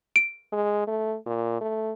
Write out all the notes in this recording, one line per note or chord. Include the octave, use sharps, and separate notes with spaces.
D7
G#3
A3
A#2
A3